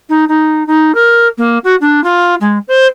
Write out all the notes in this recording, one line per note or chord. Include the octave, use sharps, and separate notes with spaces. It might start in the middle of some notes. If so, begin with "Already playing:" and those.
D#4
D#4
D#4
A#4
A#3
F#4
D4
F4
G#3
C5